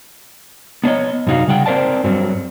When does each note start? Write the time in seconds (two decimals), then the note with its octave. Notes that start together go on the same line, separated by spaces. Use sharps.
0.84 B3 D4 C#5 D#5
1.27 F#2 C3 D#4 F#4 F5
1.47 C#3 G3 F#5 G5
1.66 C4 A#4 C5 D5 A5
2.04 G2 F#3 G3 C4